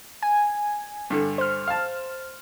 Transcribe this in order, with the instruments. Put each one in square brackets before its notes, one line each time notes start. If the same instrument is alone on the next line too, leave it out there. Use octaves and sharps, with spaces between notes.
[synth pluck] G#5
[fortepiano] G2 D3
[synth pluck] C5 F6
[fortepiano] F5 A5